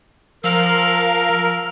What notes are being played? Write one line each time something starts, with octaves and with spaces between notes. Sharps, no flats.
F3 A#4 F5 E6 F7